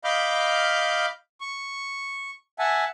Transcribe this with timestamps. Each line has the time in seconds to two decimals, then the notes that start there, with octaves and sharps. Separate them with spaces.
0.04 D#5 F5 B5 D6 F6 G6
1.41 C#6
2.59 E5 F#5 G#5 A5